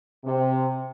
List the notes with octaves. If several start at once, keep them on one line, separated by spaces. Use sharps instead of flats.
C3